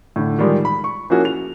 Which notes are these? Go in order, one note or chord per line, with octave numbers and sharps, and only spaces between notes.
A2 D3
D#3 F3 G3 G#3
B5
C#6
F3 A#3 C#4 E4 F#4 G#4
F7